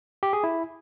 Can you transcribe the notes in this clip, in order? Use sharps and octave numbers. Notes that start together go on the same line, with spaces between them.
G4
G#4
E4